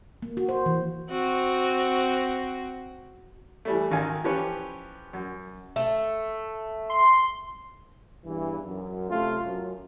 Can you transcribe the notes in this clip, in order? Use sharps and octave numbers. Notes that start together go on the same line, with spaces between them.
A#3
F#4
C5
E3
C4 F#4
E3 G3 A3
G#1 D#3 F5 G#5
E3 F3 C#4 G4 B4 C#5
F#2
A3
C6
E2 G2 E3
F#2
C3 A3 F4
F#2